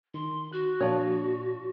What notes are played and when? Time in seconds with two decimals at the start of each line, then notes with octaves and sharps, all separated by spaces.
0.14 D#3 C6
0.52 F#4 F#6
0.81 A#2 F3 D4 C#5